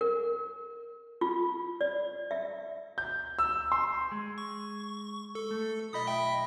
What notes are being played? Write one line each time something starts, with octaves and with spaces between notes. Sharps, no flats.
A#4
F4
D5
E5
G6
E6
C6
G#3
C#6
A4
A3
B1 F4 D#5 B5 D#6
D#5 E5 G5